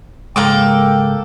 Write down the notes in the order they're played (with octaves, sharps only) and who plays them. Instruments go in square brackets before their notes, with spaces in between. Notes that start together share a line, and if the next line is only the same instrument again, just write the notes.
[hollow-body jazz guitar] C#2 G#2 G#3 [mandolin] A#3 A4 D6 [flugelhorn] G5